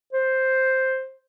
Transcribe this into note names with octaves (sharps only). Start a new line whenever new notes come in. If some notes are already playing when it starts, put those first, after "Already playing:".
C5